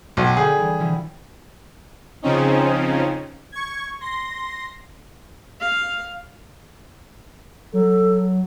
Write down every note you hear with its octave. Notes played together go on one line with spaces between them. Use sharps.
B1 G5 F#6
D3 G#4 B4 G6
E3 G3
B2 E3 F3
C#3 F3 C4 C#4 D#4
C#6 G#6
C6 A#6
F5
F#3 A4